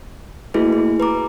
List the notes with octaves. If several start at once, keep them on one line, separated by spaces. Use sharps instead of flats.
A3 A#3 E4 F#4 G#4 B4
G#4
B4 A#5 D6